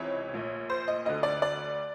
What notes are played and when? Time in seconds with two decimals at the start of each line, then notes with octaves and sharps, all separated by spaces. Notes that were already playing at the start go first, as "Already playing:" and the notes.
Already playing: C#2 C3 E3 C#5
0.33 A#1 A#2
0.70 C5
0.88 D#5
1.05 D2 D3 D#5
1.23 D5
1.42 D5